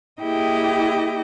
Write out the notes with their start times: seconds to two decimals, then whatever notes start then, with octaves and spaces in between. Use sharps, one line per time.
0.22 A#3 E4 G4 G#4 D#5 G5